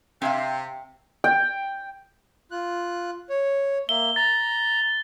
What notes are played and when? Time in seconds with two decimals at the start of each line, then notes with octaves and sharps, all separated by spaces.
0.22 C3 C4 E5 F5
1.24 G5
2.51 F4 F#6
3.30 C#5
3.89 A#3 E5 G7
4.16 A#5 A6